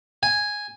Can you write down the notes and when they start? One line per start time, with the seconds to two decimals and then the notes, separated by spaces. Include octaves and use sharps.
0.23 G#5